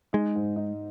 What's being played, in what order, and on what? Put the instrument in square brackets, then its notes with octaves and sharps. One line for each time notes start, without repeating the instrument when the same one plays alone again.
[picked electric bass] G#3 [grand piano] D#4
[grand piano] G#2
D#4